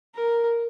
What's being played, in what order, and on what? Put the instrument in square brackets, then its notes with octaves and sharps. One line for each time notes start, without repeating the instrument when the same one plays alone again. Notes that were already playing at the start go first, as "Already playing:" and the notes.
[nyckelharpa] A#4